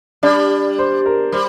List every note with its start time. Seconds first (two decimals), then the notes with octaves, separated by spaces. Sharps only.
0.23 G3 D4 D5
0.79 C5
1.06 A#4
1.32 G3 C5